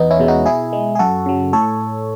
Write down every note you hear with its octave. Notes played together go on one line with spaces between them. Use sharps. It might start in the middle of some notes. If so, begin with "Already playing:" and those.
Already playing: E2 B3 D#4
C#4 E4
B2 G#3
D#4 F#4
B2 E4 G#4
G#3
G#4
F#2 F#4 A4
C#3 F#3
A2 A4 C#5